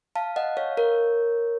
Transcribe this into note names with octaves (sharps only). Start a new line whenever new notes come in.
F5 A5
D#5 F#5
C#5 F5
A#4 C#5